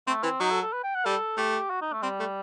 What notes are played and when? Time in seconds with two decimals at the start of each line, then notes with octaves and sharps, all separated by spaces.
0.07 A3 C4
0.23 E3 C4
0.40 F#3 D#4
0.51 A4
0.62 A4
0.73 B4
0.84 G5
0.95 F#5
1.05 G3 A4
1.37 A3 G4
1.70 F#4
1.81 D#4
1.93 A3
2.03 G3 C4
2.19 A3